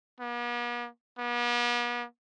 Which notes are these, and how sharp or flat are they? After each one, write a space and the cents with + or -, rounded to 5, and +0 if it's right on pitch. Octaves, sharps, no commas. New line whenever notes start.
B3 -45
B3 -45